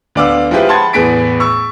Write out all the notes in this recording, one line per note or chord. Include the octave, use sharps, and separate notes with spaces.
D2 B3 D5 F5 D6 E6
F3 G#3 E4 F4 G4 B4
F#5 A5 B5 C6 G#6 A6
E2 A2 B3 G#4 B6 D7
C#6 E6